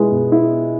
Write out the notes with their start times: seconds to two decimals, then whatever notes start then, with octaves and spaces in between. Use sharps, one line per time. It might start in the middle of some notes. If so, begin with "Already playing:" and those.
Already playing: B2 G#3 B3 E4
0.11 B2
0.32 E4